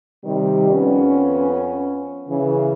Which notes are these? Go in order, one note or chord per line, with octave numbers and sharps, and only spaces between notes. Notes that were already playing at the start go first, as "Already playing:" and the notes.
C3 D#3 G3
F2 B3 C#4
C#3 E3